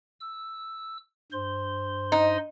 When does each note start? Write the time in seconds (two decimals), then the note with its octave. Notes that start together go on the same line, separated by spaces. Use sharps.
0.20 E6
1.32 G2 C5 C6
2.12 D#4